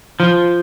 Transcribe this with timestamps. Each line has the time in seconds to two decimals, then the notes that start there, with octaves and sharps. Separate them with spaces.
0.20 F3